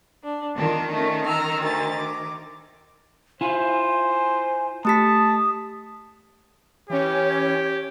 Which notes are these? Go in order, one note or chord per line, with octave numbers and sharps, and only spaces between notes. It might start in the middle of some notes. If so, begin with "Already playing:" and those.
D4
D#3 D4 F4
A3 C#4
A#5 E6 F6
D2 A6
D6
E4 F4 C5 G#5
A3 G4 A5 D#6 B6
E3 C#4 G4 C#5